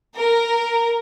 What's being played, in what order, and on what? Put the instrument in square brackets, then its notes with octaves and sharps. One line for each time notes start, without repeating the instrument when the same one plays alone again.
[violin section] A#4